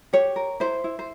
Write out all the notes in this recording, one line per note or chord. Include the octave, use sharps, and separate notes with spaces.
G4 C#5
A#4
E4 C5
E4
C5